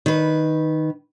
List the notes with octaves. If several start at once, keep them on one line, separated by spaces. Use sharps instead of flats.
D#3 B4